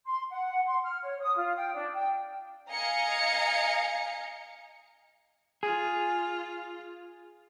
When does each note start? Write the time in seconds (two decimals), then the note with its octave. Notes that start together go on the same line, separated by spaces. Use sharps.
0.06 C6
0.30 F#5
0.66 C6
0.84 F6
1.03 C#5
1.21 D#6
1.36 F4
1.56 G5
1.74 D4
1.94 G5
2.71 D#5 F5 G#5 A#5 C#7
5.63 F4 G#4